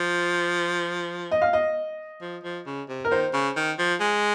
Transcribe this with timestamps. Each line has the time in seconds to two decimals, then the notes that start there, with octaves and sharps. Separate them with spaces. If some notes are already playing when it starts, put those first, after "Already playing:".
Already playing: F3
1.31 D#5
1.42 F5
1.53 D#5
2.22 F3
2.44 F3
2.66 C#3
2.89 C3
3.05 A#4
3.11 D#3 C5
3.33 C#3
3.56 D#3
3.79 F3
4.01 G#3